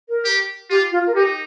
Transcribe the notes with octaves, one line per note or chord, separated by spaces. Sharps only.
A#4
G4
F4 G4
F4
A#4
D#4 G4